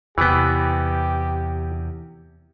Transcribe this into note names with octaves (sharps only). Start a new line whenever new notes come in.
E2 C3 E3 B3 G4